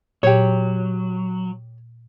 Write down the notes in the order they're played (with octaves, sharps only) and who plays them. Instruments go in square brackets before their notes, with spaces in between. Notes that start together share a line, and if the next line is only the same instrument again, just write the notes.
[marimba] A#2 [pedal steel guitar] F#3 [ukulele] G4 C#5